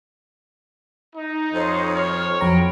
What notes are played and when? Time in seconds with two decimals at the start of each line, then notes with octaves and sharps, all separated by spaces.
1.16 D#4
1.53 F2 C5 C#5
1.92 C#5 F6
2.41 F2 F#3 G5 A#5 B5